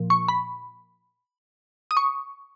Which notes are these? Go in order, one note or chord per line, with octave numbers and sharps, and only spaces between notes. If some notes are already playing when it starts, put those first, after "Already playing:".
Already playing: A#2 F3
C#6
B5
D#6
C#6